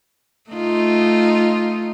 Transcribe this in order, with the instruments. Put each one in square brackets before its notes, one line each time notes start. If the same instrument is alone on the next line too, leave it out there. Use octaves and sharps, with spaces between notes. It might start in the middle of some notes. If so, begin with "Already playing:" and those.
[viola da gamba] A3 D#4 F4